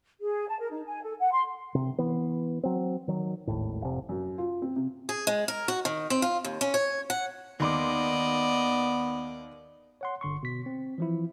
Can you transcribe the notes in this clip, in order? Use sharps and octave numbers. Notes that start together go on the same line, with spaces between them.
G#4
A5
A#4
D#4
G#5
A4
F#5
C6
C3
E3 B3
F#3 C4
D#3 F#3
G#1 D#2 A2
F1 C3
F#2
F4
C4
C3
G#4
G#3
A#4
F#4
D#3
C4
F4
D#2
C#4
C#5
F#5
D#2 B3 D5 D#5 C6 D6
C#5 F#5 C6
G1 D3 C6 C#6
B2 B6
C4
E3 F3 E4